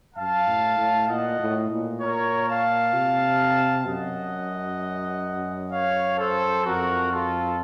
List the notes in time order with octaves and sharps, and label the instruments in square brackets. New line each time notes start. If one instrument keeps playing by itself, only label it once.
[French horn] F#2 [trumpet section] F5 A5
[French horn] A2
A2
[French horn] A#2 [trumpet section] D#5 F#5
[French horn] A2
A#2
[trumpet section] A#4 C#5
F5 A5
[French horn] C3
[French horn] F#2 [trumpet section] D#5 F#5
[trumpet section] C#5 F5
A4 C5
[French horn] F2 [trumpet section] F#4 A#4
[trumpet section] F4 A4